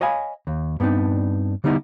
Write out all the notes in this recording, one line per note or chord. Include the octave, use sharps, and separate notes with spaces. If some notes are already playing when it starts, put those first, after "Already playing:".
C#5 D#5 F5 G#5 B5
D#2
G2 B3 C4 D4 D#4
D3 G3 B3 D#4 E4 D#5